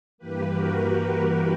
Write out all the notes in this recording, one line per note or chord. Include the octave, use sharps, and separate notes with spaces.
G2 E3 A#3 G4 B4
F#4 A#4
F#4